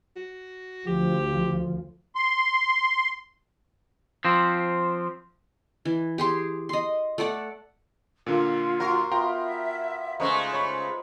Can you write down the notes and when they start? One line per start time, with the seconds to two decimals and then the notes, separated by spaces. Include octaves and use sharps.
0.16 F#4
0.87 D2 F3 G4
2.15 C6
4.25 F3 C4
5.85 E3
6.18 G4 G#4 C6
6.69 D#5 C6
7.18 A3 A4 D5 F#5
8.26 A#2 D3 A#3 F4
8.80 F#4 A#4 F5 C6
9.12 B3 F4 E5 G5 A#5 C6
10.20 C#3 G#3 A3 D#4 B4 C5 C#6
10.53 C#5 B5